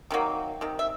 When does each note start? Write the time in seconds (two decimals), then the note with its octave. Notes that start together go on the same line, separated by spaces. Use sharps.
0.10 C3 D#3 F#3 A#3
0.61 C3 D#3
0.79 E5